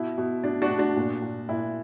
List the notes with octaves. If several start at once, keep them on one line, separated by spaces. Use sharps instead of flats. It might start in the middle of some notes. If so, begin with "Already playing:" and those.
Already playing: B2 E4
B2
B2 D4
D4 F#4
B2
D4 F#4
A#2
A#2
A#2 E4